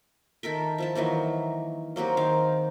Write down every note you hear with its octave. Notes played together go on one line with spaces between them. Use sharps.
D#3 A4 A#4 E5
F3 E4 A5
D#3 E3 F#3 A#3
F#3 A#3 C4 G4
D#3 F5